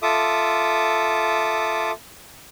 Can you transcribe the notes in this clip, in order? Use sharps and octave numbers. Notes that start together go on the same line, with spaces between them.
F4 A4 E5 D6 D#6